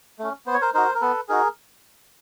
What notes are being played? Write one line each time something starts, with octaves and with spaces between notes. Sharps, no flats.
A3 C#4
B3 C5
C#5
A#4 C5
D#4 F#4 A#4 C5
A#4
B3 A4 B4
D#4 F#4 G#4 A#4